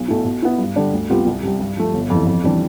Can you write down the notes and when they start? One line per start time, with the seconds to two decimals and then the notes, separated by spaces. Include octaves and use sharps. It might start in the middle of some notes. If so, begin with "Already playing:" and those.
Already playing: B1
0.08 B2 A3 E4
0.25 B2
0.42 B3 E4
0.58 G2
0.76 D3 G3 D4
0.93 D2
1.10 C3 G3 B3 F4
1.26 C2
1.43 C3 G3
1.60 G2
1.77 F3 A3
1.94 G1
2.10 F2 E3
2.27 F2
2.44 C3 E3 G3 D4